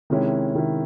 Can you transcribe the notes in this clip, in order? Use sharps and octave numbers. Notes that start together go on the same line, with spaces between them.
C3 D#3 G#3 C#4 E4
C3 D#3 G#3 C#4 E4